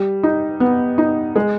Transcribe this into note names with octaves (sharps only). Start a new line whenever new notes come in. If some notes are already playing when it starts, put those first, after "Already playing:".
Already playing: G3
D#4
B3
D#4
G#3